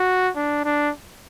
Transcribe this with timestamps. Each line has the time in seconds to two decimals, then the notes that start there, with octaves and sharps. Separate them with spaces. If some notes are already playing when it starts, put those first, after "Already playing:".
Already playing: F#4
0.36 D4
0.65 D4